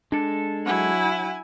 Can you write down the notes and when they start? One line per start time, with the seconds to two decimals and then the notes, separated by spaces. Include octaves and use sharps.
0.12 G#3 D4 A4
0.66 F#3 E4 F#5 G#5